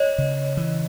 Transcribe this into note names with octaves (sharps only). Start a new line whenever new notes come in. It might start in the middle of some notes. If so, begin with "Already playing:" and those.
Already playing: C#5 D#5
C#3
E3